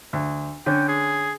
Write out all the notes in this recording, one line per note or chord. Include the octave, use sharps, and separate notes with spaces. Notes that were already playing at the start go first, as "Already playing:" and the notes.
D2
D3 C#4 G5
G#4